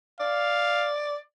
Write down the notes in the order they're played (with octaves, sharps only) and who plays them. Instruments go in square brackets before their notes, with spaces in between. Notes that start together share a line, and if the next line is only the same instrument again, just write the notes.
[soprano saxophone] D5 [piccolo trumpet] F5